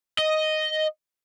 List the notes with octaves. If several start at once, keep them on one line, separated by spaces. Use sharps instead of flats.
D#5